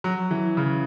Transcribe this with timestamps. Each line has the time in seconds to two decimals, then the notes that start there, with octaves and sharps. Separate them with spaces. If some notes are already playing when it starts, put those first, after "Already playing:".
0.04 F#3
0.31 E3
0.57 C#3